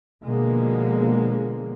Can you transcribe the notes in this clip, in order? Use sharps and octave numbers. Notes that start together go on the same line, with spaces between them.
B2 D3 F3 G#3 A#3